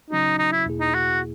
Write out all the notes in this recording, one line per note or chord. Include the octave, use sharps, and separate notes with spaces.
C#3 F#3 C#4 D#4 F#4
D#4
E4
E2 B2 A#3 E4 G#4
D#4
F#4